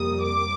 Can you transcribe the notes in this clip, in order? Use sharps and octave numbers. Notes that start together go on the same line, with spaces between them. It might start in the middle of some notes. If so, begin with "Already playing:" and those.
Already playing: F2 C3 G3 A#3 D#6
D6